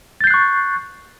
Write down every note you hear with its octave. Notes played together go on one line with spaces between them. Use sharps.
C#6 F#6 G6 A6 C7